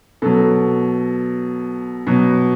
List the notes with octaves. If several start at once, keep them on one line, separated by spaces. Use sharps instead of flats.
B2 F#3 A4
B2 F#3